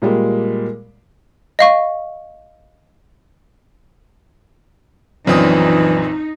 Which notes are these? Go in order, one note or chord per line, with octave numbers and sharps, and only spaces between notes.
A#2 G3 G#3 A#3
D#5 F5 C#6
A#1 F#2 A#2 E3 C4 D4 D#4 D#6